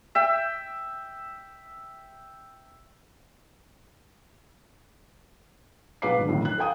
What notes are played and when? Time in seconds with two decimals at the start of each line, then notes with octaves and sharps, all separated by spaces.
0.15 E5 G5
6.02 B1 G#4 B4 F5 D6 C7
6.16 G#1 D3
6.28 B1 F2 A2 D#3
6.43 D#4 F#6
6.58 A4 F5 G5 D#6